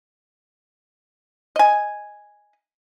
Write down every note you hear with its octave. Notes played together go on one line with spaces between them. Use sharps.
D#5 G#5